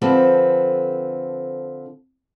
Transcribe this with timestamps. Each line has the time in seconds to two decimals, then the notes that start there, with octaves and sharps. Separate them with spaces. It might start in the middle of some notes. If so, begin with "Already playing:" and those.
0.02 D3 F3 C4 A4 B4